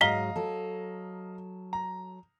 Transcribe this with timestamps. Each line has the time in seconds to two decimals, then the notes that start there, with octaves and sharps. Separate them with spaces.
0.01 G#2 F#3 D#5 F5 A#5 B6 G7
0.36 F#3 A4
1.73 A#5